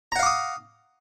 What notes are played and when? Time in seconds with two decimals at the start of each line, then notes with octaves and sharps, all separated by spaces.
0.12 A#5
0.16 F#5
0.19 F5
0.23 D6
0.26 D#6